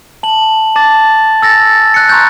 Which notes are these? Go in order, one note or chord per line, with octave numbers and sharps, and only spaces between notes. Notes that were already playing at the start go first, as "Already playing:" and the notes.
A5 F#7
A5 D6 A6
G#5 E6 A6 A#6
F#6 C#7
A#5 C6 C#6 F#6 G6